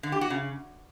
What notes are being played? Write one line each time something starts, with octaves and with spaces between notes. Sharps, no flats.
D3
G4
F#4
C#3